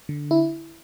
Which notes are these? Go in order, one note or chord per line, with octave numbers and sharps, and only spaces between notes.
D3
E4